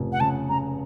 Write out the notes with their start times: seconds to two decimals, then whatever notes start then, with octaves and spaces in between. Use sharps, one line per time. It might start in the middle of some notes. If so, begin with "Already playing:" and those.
Already playing: F1 C#3 F3
0.12 F#5
0.20 C#3 A5
0.49 C#3 A#5